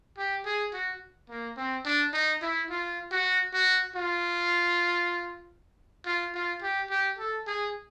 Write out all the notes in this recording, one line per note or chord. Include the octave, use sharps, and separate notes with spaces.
G4
G#4
F#4
A#3
C4
D4
D#4
E4
F4
F#4
F#4
F4
F4
F4
G4
G4
A4
G#4